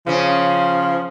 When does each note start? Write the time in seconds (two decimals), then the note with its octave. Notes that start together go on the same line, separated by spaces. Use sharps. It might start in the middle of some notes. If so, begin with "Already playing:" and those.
0.07 C#3 F3 C#4